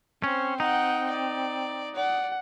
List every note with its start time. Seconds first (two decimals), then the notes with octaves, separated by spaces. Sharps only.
0.24 C4 C#4 C5
0.60 D#4 F#5 G5
1.10 D5
1.96 D5 F#5